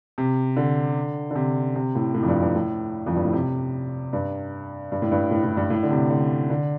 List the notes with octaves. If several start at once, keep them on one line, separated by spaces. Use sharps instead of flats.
C3
D3
D3
C3
C3
A2
A2
F2
G2
G2
A2
F2
G2
A2
C3
G2
G2
A2
G2
A2
A2
G2
A2
D3
C3
D3
D3